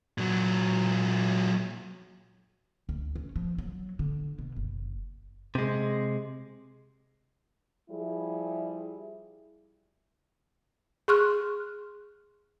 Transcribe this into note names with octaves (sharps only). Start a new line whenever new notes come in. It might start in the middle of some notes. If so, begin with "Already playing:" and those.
A#2 F#3
D2
C#4
F3
F#3
D3
B2
F#1
C3 G#3
F3 G3 E4 G#4
G#4 C6 C#6 F6 F#6